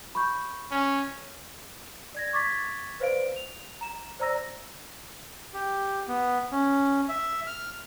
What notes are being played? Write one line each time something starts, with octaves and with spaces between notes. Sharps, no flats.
B5 C#6 G6
C#4
D5 G#6 A#6
C#6 D6 G#6 A6 B6
B4 C5 D5 F5 D7
F7
A#5 E7
C5 D5 A#5 E6 A#6
G4
B3
C#4
E5
F6